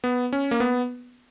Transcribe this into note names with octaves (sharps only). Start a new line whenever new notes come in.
B3
C#4
A#3
B3